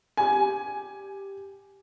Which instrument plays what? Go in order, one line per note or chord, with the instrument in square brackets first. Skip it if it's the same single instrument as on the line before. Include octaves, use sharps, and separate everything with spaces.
[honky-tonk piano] G4 G#5